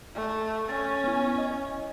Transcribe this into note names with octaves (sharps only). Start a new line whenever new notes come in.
A3
C#4 A6
B3 E4
D#5